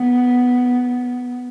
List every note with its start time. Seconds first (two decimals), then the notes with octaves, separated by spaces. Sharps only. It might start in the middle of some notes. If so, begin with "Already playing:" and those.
Already playing: B3